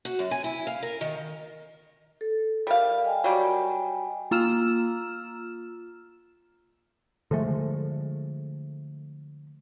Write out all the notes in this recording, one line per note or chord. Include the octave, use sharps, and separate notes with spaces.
F#4
F#2
G#5
E4
F5
A#4
D#3
A4
G3 A#4 F5
D#5 G5 G#5
F#3 G3
A#3 F4 A#5 E6 F6 E7
D3 F3 G#3 A3